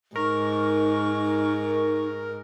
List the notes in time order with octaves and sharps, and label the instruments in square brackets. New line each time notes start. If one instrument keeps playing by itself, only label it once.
[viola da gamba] G#2 [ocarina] D#4 [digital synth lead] A#4 [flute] C#6